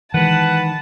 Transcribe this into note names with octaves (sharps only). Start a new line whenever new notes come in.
D#3 E3 G#3 B4 F#5 A5